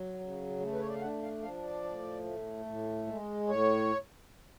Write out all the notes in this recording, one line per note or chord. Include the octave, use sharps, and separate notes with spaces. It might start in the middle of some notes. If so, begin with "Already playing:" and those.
Already playing: F#3
C#3
A3
B4
C#5
D5
F5
D4 F#5
F5
F3 F5
D5
A2
A3
A2
G#3
A2 C#5